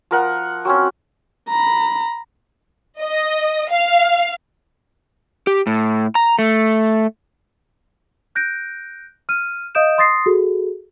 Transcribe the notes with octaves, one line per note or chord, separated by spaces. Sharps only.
F3 A#4 F#5
F#3 C4 C#4
A#5 B5
D#5
F5
G4
A2
A#5
A3
F#6 G6 A#6 D7
F6 D#7
D#5 F5 D#6 G6 D7 E7
C6 D#6 A6 A#6 C7
F#4 G#4 A4